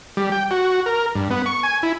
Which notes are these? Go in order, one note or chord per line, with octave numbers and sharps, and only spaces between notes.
G3
G5
F#4
A#4
G2
B3
C#6
G#5
E4